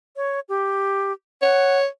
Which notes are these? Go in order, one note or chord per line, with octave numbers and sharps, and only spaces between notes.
C#5
G4
C#5 F#5